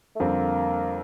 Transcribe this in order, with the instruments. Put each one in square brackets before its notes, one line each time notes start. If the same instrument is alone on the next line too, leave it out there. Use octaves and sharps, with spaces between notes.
[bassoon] A3
[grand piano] F2 D3 G3 C4 [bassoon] A#3